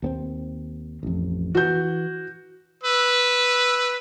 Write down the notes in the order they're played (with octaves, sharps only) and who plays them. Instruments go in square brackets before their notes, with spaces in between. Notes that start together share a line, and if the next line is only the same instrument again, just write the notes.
[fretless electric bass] D#2 B3 C4
A1 F2
[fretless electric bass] E3 [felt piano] F#4 G6
[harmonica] B4 E6